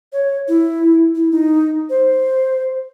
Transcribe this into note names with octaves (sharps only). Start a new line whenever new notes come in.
C#5
E4
E4
D#4
C5